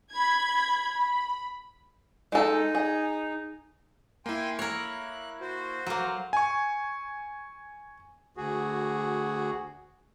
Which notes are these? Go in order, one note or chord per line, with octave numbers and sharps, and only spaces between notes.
B5 G#6
B5
G#3 D#4 A4
G#4
A#3 E4 G5 G#5 C6
A#4 C#5 F#6
F#4 C5
F#3 A#3
G#5 C#6
D2 F#4 G#4